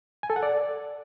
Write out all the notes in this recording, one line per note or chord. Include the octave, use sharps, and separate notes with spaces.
G#5
A4
F#5
D5